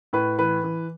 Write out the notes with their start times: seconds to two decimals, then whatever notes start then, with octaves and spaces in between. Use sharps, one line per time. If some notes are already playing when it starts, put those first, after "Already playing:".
0.13 A2 B4
0.39 E3 B4
0.64 E3